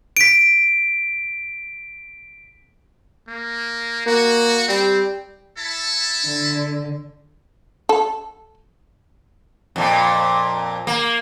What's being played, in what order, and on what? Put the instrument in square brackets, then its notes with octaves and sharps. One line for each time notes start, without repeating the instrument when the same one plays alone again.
[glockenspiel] B6 D7
[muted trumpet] A#3
[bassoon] A#3 [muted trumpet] F#4
[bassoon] G3 [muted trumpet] C4
[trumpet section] E4 A4 A5
[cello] D3
[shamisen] A4
[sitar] F2 A#2
A#3